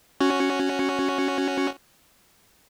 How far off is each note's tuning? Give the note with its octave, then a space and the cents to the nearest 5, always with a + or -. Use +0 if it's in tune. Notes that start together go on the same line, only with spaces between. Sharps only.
C#4 +0 F#4 +0